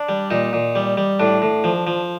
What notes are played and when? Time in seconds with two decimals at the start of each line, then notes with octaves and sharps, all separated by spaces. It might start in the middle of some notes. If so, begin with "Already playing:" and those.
Already playing: D4
0.09 G3
0.31 A#2 D#4
0.53 A#2
0.75 G3
0.97 G3
1.19 A2 D4
1.42 A2
1.64 F3
1.87 F3